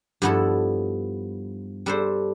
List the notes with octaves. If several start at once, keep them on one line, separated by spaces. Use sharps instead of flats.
G2 F3 B3 E4 A4
G3 D4 A4 C5